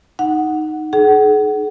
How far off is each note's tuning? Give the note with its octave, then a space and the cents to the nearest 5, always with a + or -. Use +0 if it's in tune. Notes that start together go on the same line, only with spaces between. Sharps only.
D#4 +0 F#5 +0
D#4 -40 G#4 +40 F#5 +25